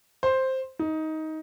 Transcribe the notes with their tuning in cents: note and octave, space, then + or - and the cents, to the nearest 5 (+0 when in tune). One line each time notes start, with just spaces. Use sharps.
C5 +5
D#4 +15